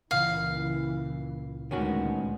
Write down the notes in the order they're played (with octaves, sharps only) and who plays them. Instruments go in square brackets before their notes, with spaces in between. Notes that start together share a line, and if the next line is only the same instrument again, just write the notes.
[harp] C#2 A#2 [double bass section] E3 [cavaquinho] F5
[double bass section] D2 A#2 G#3 [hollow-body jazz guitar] D#3 C#4 F#4 [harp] B3